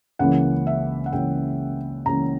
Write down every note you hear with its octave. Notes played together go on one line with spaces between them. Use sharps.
C#2 C#3 E3 A#3 F#5
E5
F#5
C#2 C#3 E3 A#3 G5
C#2 C#3 E3 A#3 A#5